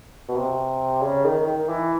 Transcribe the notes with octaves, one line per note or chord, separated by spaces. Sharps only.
B2
C3
C#3
D#3
D#3
E3